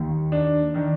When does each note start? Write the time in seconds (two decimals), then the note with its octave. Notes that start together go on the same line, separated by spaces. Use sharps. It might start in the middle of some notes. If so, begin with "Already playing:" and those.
Already playing: D#2 D#3
0.32 D4
0.74 D#3 D4